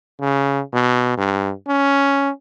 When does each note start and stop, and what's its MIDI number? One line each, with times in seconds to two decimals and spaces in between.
0.20 0.60 49
0.73 1.14 47
1.17 1.52 43
1.67 2.30 61